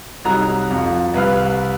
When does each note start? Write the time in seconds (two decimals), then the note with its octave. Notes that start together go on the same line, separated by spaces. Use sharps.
0.25 C2 F#3 D#4 A#5 F#6
0.71 F2
1.14 C2 B4 F5 F6